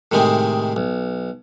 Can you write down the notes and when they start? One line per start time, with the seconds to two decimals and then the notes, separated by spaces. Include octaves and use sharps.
0.12 A2 C3 D#3 G#3 C4
0.76 B1